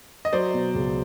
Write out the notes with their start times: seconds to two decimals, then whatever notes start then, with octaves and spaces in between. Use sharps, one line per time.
0.25 D#5
0.33 F#3 C5 D5
0.54 B2
0.74 C#2